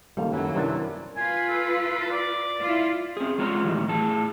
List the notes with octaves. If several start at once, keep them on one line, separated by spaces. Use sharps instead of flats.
C#2 D#3 G3 A#3 A4 F5
F#2 E3 F#3
F#2 C3 D4 E4 A#4
F4 B4 G#5
A4
D5
E4 F4
C4 G#4
G2 G#3 F4 C#5 G#5 A#5
A2 D#3 E3 G3
A2 G#4 A5